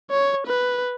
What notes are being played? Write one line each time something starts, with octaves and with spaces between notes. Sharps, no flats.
C#5
B4